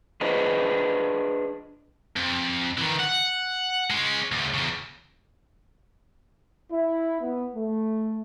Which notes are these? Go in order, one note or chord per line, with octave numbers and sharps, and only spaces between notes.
D4 F4 G#4 B4 C5 D#5
F2
D#3 E3
F#5
G#3 C#4
D2 C#3
E2 C#3
E4
B3
A3